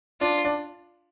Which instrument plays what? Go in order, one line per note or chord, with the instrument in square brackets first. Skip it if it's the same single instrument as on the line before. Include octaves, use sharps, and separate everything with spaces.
[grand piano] D4 [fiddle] F4
[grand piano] D4